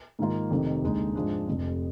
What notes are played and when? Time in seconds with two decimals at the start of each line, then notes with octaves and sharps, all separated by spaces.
0.19 G#2 D#3 A#3 F4
0.51 F1 F2 C3 D#3
0.83 D#2 D3 G#3 D#4
1.15 G#2 F3 G#3 D4
1.48 F1 F2 C3